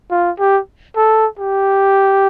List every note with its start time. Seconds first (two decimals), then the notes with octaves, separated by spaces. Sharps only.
0.11 F4
0.39 G4
0.96 A4
1.38 G4